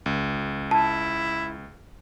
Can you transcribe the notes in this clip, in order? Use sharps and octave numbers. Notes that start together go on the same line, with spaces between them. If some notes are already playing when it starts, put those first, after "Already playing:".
C#2
E4 A5